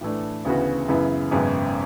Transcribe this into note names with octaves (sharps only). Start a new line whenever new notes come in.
A2 E3 A3 D4
D2 C#3 E3 B3 F#4
F#2 C#3 E3 B3 E4
G#1 F#2 C#3 G#3 B3